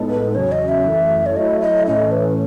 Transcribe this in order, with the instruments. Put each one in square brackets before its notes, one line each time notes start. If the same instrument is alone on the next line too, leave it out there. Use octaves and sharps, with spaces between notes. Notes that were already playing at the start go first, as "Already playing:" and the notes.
Already playing: [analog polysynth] A2 G#3 B3 D#4 A4
[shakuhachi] B4
[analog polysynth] E2 C#3 F#3 C#4 [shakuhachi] C#5
[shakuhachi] D#5
E5
[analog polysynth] F#2 E3 A3
[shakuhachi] C#5
[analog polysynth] F#3 A3 E4 [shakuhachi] D#5
[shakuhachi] D#5
[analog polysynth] A2 E3 A3 C#4 [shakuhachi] D#5
[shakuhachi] B4